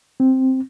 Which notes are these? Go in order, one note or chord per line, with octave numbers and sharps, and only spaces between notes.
C4